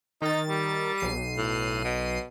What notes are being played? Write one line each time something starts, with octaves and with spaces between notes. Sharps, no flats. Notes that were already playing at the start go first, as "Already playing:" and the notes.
D#3 D#4 A6
G3
B1 C7 D#7
A2
B2